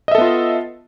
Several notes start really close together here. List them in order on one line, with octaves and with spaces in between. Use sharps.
D#5 E5 A4 B3 F4